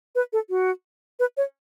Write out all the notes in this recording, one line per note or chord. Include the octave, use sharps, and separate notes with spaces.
B4
A4
F#4
B4
C#5